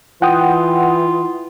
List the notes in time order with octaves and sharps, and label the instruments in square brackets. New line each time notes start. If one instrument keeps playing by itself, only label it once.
[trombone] E3 [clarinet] F4 [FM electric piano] F#5 G5 D#6